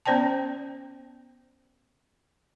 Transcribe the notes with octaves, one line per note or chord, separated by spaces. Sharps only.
B3 C#4 C5 D5 G5 A5